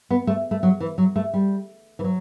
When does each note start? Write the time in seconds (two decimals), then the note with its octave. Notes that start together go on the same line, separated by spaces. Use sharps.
0.10 B3
0.27 A3
0.51 A3
0.63 F#3
0.80 E3
0.98 F#3
1.16 A3
1.34 G3
1.99 E3
2.04 F#3